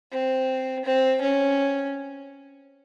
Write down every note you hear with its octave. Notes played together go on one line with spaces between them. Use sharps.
C4
C4
C#4